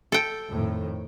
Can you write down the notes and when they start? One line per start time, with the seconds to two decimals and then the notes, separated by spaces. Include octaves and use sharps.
0.12 A4 G5
0.50 F2 A2 D#3